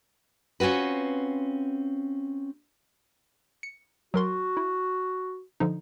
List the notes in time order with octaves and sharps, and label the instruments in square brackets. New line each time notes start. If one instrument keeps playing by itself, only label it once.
[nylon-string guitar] C4 C#4 F4 F#4 B4
[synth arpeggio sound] C#7
[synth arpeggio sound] F#3 A#4 C6 [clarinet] F#4
[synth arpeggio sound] E4
D3 F3 D#4